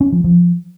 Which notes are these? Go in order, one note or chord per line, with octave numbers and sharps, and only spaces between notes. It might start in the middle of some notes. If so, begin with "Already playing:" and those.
C#4
F3
F3